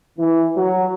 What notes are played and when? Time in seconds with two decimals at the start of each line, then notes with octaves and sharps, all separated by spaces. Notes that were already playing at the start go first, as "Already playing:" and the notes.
0.18 E3
0.56 F#3